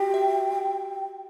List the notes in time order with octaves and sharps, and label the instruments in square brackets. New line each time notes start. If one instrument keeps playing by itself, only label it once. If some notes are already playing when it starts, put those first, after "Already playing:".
Already playing: [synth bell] F#4 G4 [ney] G5
[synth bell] E5